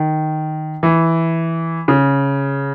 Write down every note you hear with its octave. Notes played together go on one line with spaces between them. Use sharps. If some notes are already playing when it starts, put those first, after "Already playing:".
Already playing: D#3
E3
C#3